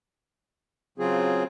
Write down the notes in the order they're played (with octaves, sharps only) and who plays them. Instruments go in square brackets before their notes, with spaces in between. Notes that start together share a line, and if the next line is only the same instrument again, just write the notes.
[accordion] C#3 F#3 C4 F4 G#4